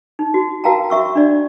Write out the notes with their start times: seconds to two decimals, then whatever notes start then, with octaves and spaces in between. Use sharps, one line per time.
0.19 D#4
0.34 F#4
0.64 F#4 A#4 F5 G5 A5 A#5
0.90 F#4 E5 C#6 E6
1.15 D4 D5